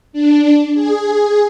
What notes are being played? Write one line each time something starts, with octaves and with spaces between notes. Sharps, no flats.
D4
G#4